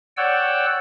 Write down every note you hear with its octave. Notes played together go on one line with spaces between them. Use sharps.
C#5 D5 F#5 G5 E6